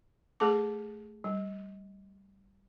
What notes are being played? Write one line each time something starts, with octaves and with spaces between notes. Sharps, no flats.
A3 G#4 A4 A5 D6
G3